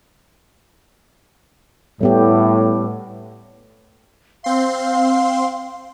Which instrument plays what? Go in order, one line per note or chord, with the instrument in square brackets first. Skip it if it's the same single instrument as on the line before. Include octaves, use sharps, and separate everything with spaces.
[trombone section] A2 [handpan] G3 B3 G4
[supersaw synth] C4 C6 [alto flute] F5